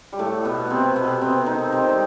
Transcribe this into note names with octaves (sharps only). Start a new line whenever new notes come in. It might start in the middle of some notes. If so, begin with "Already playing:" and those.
G3
A2 A3
B2 B3
C3 C4
B2 B3
C3 C4
D#3 D#4
C3 C4
G3